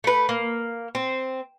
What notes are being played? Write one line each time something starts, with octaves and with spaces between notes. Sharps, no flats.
A3 B4
A#3
C4